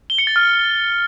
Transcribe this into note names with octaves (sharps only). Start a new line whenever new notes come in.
G7
C#7
A6
F6